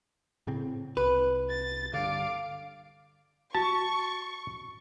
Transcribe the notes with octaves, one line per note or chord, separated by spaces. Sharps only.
A2 C#3 C4
C2 B4
A6
G2 D3 F5 D6
F#4 A5 C#6